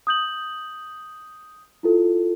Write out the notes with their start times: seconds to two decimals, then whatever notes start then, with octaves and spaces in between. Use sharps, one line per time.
0.07 D#6 G6 F#7
1.83 E4 F4 A4